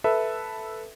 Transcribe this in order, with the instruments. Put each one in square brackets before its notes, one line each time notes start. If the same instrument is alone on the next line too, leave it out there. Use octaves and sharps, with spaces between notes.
[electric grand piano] A4 B4 E5